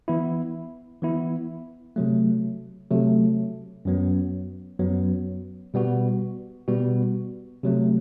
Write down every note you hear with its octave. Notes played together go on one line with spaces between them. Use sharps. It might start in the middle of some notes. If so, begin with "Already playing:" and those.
E3 B3 E4
E3 B3 E4
C3 F#3 A3
C3 F#3 A3
F#2 F#3 B3
F#2 F#3 B3
B2 G3 B3 F#4
B2 G3 B3 F#4
C3 F#3 A3